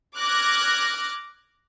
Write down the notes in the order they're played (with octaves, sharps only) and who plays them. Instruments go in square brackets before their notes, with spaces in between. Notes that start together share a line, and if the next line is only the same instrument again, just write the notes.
[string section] D6 F6 F#6 G#6 A#6